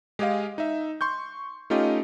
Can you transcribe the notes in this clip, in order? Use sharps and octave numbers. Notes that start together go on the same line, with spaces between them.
G#3 G4 G#4 D#5 F5
D#4 E5
C6 C#6 G6
A3 C#4 D#4 F4 G4 D#5